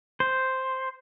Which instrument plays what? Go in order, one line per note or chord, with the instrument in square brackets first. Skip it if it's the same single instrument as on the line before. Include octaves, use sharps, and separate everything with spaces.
[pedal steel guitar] C5